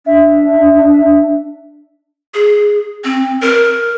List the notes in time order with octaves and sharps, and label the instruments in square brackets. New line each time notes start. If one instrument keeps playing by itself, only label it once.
[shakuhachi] D4 [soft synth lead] E5
[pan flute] G#4
C4
A#4